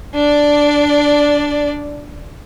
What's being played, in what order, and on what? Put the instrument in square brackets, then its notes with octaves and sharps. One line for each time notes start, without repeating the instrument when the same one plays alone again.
[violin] D4 D5